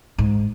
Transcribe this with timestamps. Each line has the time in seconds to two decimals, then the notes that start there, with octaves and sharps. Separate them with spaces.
0.18 G#2